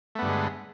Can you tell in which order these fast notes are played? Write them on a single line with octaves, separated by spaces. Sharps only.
A3 B3 G2 D3 G#3